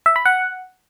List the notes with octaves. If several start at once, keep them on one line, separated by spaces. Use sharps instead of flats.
E5
B5
F#5